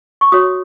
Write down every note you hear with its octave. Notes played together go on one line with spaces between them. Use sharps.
C#6
F#4 C#5 D#6